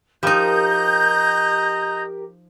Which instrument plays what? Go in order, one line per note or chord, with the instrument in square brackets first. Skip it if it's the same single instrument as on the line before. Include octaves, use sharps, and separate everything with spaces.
[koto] F3 D#4 [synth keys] G4 A#4 [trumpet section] D#5 A#5 [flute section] G6